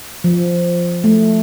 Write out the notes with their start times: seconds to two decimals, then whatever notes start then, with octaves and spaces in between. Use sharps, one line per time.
0.24 F3
1.04 A3